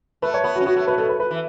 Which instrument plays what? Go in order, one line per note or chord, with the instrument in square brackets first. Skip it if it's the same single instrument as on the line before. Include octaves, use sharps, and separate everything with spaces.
[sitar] A3 [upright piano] B4
[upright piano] C#5
[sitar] B3 [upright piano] B4
[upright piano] F#4
[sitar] C#4
[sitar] B3 [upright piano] F#4
[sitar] A3 [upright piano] F#4
[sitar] B2 [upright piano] B4
[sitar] B2 [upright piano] A4
[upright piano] B4
B4
[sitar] E3